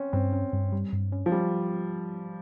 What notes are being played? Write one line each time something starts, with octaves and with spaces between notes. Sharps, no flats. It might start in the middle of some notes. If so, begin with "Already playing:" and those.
Already playing: C4 C#4
G2 C4
C#4
G2
G3
G2
C#4
F3
G3